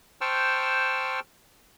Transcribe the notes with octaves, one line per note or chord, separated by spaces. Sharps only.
C5 G5 A5 C#6 E6 F6